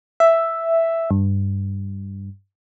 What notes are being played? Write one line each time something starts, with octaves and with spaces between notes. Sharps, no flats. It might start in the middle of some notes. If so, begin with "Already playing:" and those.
E5
G2